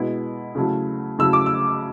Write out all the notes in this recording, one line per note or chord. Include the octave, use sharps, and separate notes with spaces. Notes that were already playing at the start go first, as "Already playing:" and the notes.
Already playing: B2 G#3 B3 E4
C#3 F#3 A3 E4
C#3 F#3 A3 E4 E6
D6
E6